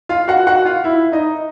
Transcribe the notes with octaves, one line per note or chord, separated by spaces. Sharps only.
F4 F5
F#4 F#5
F#4 F#5
F4 F5
E4 E5
D#4 D#5